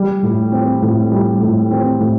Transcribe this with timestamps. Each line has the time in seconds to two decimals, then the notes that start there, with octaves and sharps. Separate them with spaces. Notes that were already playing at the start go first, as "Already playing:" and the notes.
Already playing: G3
0.23 A2
0.52 C4
0.82 A2
1.12 G3
1.41 A2
1.71 C4
2.00 A2